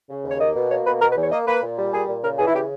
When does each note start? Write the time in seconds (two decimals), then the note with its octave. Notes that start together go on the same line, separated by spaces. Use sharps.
0.10 C#3
0.24 D#2
0.30 C#5
0.40 A#3 D#5
0.56 B2
0.70 A#3 C#5
0.86 B2 B4
1.01 B2 A#4
1.11 B4
1.16 E2
1.22 C#5
1.32 A#3 D#5
1.47 A#3 B4
1.63 A#2
1.78 G3
1.93 A#2 G#4
2.09 A#2
2.23 C#3 A#4
2.38 E3 G#4
2.47 E4
2.54 C#3 G4